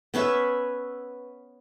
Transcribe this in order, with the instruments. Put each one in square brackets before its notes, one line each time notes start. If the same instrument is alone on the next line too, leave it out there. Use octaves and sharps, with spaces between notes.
[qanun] B3 C#4 B4 E5